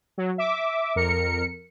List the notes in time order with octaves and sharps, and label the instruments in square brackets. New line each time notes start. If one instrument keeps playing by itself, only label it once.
[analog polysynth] F#3
E5 D6
F2 A#4 C#7